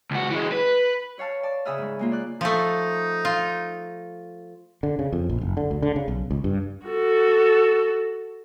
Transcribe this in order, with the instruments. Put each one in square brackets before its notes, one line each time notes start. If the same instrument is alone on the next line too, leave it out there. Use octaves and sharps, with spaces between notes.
[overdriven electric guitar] C#2 F#4
E3 G#3
B4
[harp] B4 C#5 F5 A5 F6
D5 A5
C#3 G#4 E5 B5 D#6 F6
G#2 G#3
G#3 A#3 F4
D5 F#6
[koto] F3 A3 [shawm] D#4
[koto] F4
[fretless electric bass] D3
C#3
F2
A#1
F#1
D3
D2
D3
C#3
B1
C#2
G2
[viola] F#4 A4